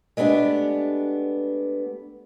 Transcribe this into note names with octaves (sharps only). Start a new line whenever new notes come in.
G#3 A3 B3 D4 G4